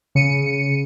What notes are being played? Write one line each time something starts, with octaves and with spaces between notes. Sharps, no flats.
C#3 C#7 D#7